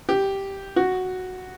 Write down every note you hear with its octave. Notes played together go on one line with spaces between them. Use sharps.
G4
F#4